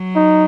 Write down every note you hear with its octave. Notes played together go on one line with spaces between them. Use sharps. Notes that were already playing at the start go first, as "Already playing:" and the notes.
Already playing: F#3
D#4